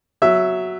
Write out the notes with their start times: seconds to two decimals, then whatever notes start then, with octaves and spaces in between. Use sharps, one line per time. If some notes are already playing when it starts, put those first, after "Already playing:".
0.22 F#3 E5